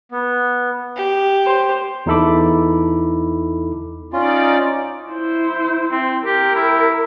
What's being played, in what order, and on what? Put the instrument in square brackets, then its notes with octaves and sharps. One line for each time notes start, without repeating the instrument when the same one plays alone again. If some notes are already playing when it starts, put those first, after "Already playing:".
[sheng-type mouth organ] B3
[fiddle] G4
[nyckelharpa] C5
[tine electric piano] E2 D#4 E4 A4 B5 D6
[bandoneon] C#4 F4 [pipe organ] D#4 D5
[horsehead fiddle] E4 C5
[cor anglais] C4
[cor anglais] G4 [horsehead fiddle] A#4
[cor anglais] E4